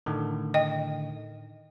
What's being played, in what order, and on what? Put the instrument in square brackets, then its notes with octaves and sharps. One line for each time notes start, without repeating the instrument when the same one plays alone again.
[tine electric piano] A2 D3 D#3
[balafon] D#5 G5